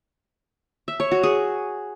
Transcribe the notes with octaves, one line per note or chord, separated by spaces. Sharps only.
E5
C#5
F#4
G#4